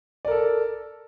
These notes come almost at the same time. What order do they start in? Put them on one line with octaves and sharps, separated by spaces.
D5 A#4 A4